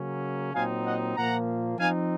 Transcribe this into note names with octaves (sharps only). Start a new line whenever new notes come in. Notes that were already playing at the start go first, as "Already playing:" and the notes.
Already playing: C#3 F#3 A#3 C#4
A#2 F#3 C4 D#4 F5 G#5
D#5 F#5
A#2 F3 A#3 F#5 A#5
F3 C4 D#4 F5 G#5